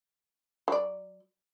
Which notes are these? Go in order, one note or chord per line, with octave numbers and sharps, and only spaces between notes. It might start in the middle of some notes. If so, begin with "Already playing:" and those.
F#3 D5